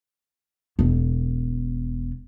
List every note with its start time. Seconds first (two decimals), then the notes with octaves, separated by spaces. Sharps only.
0.79 E1 B3